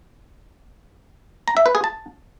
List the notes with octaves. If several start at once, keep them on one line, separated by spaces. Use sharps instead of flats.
A#5
E5
B4
G#4
A5